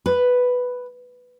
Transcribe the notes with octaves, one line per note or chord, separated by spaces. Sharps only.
B4